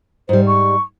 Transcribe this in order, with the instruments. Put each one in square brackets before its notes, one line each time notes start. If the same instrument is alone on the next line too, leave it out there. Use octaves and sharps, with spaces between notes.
[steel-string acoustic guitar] G#2 G3 [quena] C5
[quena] C#6